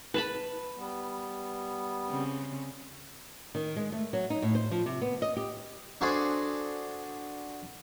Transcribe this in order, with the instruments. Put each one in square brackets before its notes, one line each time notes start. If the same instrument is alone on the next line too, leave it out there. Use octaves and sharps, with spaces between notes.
[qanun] B4 A5 B5
[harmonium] G3 B3
[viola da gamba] C#3 C4
[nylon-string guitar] D#3
G#3
A3
F#3
D#4
A2
C5
F3
C3
B3
D#5
G4
[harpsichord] D4 F#4 G#4 A4 C5 D5